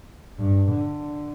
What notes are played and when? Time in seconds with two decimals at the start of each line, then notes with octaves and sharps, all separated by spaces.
0.39 G2
0.72 D3